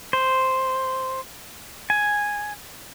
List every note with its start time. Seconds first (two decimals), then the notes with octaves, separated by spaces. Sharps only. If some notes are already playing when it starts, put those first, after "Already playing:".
0.13 C5
1.90 G#5